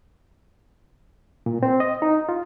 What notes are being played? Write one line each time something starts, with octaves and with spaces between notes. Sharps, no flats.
A#2
C4
D#5
D#4
F4